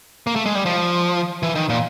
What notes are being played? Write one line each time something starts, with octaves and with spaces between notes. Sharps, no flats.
A#3
A3
G#3
G3
F3
E3
D#3
A#2